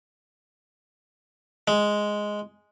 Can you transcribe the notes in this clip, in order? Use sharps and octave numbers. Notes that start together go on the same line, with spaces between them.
G#3